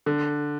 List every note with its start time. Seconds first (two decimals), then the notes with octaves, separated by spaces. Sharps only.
0.06 D3